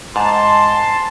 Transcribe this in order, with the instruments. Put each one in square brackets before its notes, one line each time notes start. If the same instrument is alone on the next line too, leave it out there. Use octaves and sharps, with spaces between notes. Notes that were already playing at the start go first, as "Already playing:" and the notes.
[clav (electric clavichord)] G#2 [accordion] A5 [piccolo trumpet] C6